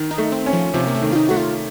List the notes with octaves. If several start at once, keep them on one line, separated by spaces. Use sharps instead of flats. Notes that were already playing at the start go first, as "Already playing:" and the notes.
Already playing: D#3
D#4
A3
C4
C#4
F3
C3 F3
A#3
A3
D#3
F4
D#4
A3 F#4
F4